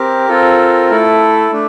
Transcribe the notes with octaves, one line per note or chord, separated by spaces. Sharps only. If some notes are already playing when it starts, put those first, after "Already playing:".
Already playing: C4 G4 A#4
C4 F4 A4
A3 E4 A4
A3 D4